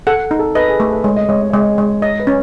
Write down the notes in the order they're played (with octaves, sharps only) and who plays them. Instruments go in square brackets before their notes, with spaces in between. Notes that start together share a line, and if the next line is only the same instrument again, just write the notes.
[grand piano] A4 [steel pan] F#5
[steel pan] D#4
[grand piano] A4
[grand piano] B4 [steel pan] D#5
[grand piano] G#4
[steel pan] A3 [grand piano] A4
[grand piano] B4
[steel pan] G#3 [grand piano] C#5
[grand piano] D#5
[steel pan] G#3 [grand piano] C#5
[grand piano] D#5
[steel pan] G#3 [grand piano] C#5
[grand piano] D#5
[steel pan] G#3
[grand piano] C#5 [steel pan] D#5
[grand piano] B4
[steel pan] C#4